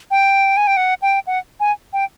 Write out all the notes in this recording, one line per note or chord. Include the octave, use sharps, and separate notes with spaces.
G5
G#5
G5
F#5
G5
F#5
G#5
G5